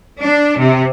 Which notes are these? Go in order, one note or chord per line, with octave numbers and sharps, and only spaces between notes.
D4
C3